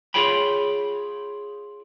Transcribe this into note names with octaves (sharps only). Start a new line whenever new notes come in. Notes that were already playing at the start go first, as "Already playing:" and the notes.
F4 G#4 C#5 G5 B5